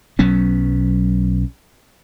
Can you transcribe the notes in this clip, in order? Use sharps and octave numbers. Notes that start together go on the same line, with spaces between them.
B1 F#3 B3 C#4